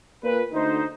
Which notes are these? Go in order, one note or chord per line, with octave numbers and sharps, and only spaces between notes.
A#2 B4
D2 D#4 C5